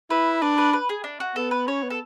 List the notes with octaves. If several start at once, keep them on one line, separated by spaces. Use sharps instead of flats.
E4 B4
D4 B4
B4
B4
G#4
D4
F#4
B3 A4
B4
C#4 C#5
B3
A4